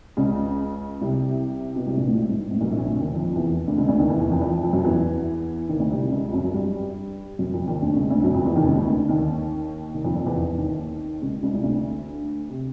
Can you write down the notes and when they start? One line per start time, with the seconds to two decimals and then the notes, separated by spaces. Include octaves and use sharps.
0.17 C#2 C#3
1.01 C2 C3
1.76 B2
1.86 C2 C3
1.97 A#1 A#2
2.08 A1 A2
2.19 G#2
2.29 G2
2.40 G#2
2.51 A1 A2
2.61 B1 B2
2.71 A#1 A#2
2.86 D2 D3
3.00 D#2 D#3
3.14 F2 F3
3.36 E2 E3
3.68 D2 D3
3.78 C#2 C#3
3.88 D2 D3
3.99 D#2 D#3
4.09 E2 E3
4.20 E2 E3
4.32 F2 F3
4.37 E3
4.42 F2 F3
4.63 F2 F3
4.73 F#2 F#3
4.84 E2 E3
5.69 D#2 D#3
5.79 D2 D3
5.90 C2 C3
6.01 C2 C3
6.11 C#2 C#3
6.33 F#2 F#3
6.44 F#3
6.54 G2 G3
7.39 F#2 F#3
7.53 F2 F3
7.67 D#2 D#3
7.82 D2 D3
7.96 C#2 C#3
8.10 D2 D3
8.24 F#2 F#3
8.34 F2 F3
8.46 E2 E3
8.56 D#2 D#3
8.66 C#2 C#3
8.88 D2 D3
9.09 D#2 D#3
9.94 D#2 D#3
10.05 F2 F3
10.15 F2 F3
10.26 E2 E3
10.37 E2 E3
10.58 D#2 D#3
11.22 C#2 C#3
11.42 C#2 C#3
11.54 C2 C3
11.64 D2 D3
12.49 C3